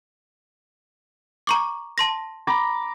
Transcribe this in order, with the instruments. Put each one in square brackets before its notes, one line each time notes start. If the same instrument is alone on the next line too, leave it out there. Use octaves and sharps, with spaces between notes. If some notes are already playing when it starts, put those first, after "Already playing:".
[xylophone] A#5 C#6 D6
A5 C6 A#6
[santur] A#5 B5 D6